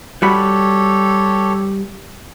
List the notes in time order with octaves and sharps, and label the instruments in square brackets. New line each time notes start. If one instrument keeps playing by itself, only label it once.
[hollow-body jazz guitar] G3 F#4 B5 [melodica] G4 A4 C#5